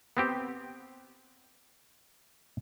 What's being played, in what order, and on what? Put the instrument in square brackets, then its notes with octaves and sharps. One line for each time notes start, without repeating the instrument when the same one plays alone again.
[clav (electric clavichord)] B3 C4 G4